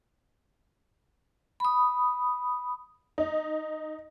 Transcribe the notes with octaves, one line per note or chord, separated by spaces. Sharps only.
B5 D#6
D#4